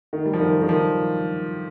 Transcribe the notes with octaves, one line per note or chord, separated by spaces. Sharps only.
D#3
G3
F3
D#3
D#3
F3